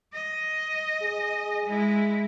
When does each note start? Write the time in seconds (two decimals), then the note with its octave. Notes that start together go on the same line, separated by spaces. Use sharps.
0.13 D#5
1.02 G#4
1.65 G#3 E4